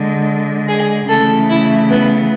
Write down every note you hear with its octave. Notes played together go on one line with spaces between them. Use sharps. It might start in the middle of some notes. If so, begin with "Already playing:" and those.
Already playing: D3 G#3
G#4
C#3 E3 A3 A4
E4
B3